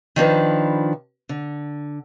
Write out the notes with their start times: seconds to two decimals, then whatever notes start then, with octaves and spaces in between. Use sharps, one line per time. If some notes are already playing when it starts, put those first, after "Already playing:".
0.16 D#3 F3 D4 B4
1.29 D3